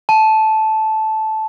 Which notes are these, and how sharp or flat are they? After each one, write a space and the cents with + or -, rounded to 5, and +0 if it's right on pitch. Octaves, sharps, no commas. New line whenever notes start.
A5 -10